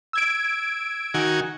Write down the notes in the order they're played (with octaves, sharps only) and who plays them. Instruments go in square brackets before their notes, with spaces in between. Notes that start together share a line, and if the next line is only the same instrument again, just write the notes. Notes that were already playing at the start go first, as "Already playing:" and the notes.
[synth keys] E6 G#6 D7
[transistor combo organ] D#3 F#4 G#5